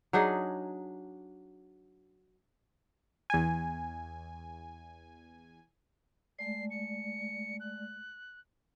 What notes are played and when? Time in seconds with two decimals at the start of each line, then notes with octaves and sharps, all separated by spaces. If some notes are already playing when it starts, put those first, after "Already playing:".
0.13 F#3 D4 D#4 G#4
3.30 E2 G#5
6.39 G#3 A3 D5 C7
6.70 C#7
7.60 F#6